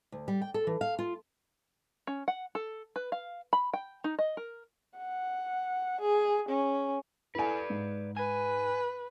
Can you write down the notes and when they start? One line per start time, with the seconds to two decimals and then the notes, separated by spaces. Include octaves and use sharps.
0.12 D2
0.28 G3
0.42 G5
0.54 A4
0.67 E3
0.81 F5
0.99 F4
2.07 C#4
2.28 F#5
2.55 A4
2.96 B4
3.12 F5
3.53 B5
3.74 G5
4.04 D#4
4.19 D#5
4.37 A#4
4.98 F#5
6.01 G#4
6.49 C#4
7.35 E4 A4 B4 D5 G#5
7.70 G#2
8.17 B4 G#5